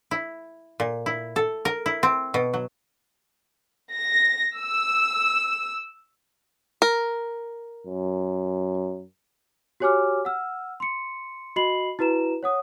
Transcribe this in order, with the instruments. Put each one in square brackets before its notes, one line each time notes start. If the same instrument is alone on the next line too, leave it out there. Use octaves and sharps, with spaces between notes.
[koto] E4
A#2
E4
A4
A#4
E4
C4
B2
F#3
[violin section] A#6
E6
[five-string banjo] A#4
[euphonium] F#2
[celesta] F#4 G4 C#5 G#5 D6 F6
F#5 E6 F6
C6 C#7
F#4 D#5 B5 C7 F#7
E4 F#4 B4 A#5 E7
C#5 F#5 D#6